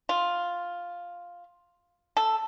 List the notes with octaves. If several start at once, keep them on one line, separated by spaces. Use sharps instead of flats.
F4
A4